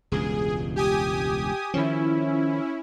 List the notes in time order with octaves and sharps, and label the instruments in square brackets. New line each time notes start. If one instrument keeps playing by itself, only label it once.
[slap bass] E1 C#2 G2 [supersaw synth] G#4
[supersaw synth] G4 G#5 D#6
[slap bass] D#3 F3 [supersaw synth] C#4 E4